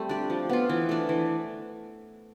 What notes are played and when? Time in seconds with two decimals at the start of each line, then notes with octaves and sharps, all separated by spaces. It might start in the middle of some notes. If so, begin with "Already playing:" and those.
Already playing: G3 A3 C4
0.09 D4 G4 D5
0.30 F3
0.49 B3 F4
0.69 E3
0.89 A3 D4
1.09 E3